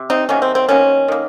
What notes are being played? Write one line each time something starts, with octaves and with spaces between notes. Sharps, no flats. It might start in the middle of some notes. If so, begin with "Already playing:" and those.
Already playing: C3
C4 D#4
C3 D#3 F#3 A#3 C#4
C4
C4
D#3 F#3 A#3 C#4
D#3 A#3